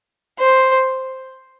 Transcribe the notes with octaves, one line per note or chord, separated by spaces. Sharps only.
C5